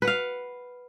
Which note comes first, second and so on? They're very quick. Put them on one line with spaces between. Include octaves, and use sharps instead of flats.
B4 F#5 F5